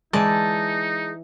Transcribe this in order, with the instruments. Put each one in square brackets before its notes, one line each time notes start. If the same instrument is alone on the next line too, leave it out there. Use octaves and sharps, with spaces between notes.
[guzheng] E3 D5 [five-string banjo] G#3 [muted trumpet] D#4 [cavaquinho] A5